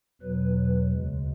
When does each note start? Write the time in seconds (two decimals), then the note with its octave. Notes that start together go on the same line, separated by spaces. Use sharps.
0.21 E2 B2 F#3 B4
0.92 D2 C#3 G#3